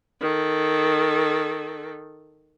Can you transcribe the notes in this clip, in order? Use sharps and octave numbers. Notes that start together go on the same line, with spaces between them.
D#3 A4